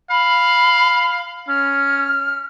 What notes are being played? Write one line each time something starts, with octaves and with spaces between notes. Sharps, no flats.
F5 B5
C#4 F6